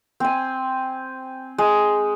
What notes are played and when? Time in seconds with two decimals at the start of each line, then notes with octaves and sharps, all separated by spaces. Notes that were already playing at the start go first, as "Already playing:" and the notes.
0.20 C4 G#5
1.58 G#3